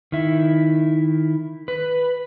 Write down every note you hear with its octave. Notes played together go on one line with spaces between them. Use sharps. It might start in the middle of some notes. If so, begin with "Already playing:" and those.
D#3 E4
B4